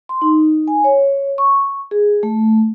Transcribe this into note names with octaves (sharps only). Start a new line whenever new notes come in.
C6
D#4
G#5
C#5
C#6
G#4
A3